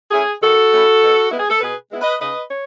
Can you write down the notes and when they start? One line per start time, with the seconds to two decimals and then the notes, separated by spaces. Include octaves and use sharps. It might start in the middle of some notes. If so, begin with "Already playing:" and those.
0.11 A3 C#4 E4 G#4
0.42 D#3 F#4 A4
0.72 A3 C#4 E4
1.01 B2
1.31 G#3 B3 E4
1.37 G#4
1.50 A4
1.61 B2 G#4 B4
1.91 G#3 B3 E4
2.01 B4 D#5
2.21 C#3 B4 D#5
2.50 C#5